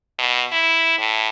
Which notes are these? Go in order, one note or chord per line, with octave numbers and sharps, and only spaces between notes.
B2
E4
A2